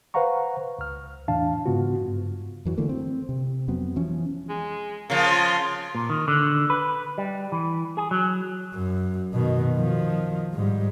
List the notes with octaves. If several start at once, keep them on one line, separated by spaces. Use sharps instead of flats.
B4 C5 F5 F#5 A#5 C#6
C#2 F6
E2 A2 E3 D4 F5 A5
G#2 C#3 B3 F4 F#4
G2
F2 E3 F#3
D3 E3 A3 A#3
C4
C3
F2 F#3 B3 C4
E3 F3 C#4
G#3
C#3 F3 A#3
F4
A#2
D#3
D3
B4
G3
E3
G#4
F#3
F#2
B2 D#3
D#3 F3
G#2 G3